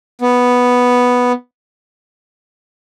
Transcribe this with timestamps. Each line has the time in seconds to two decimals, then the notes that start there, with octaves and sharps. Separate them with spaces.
0.21 B3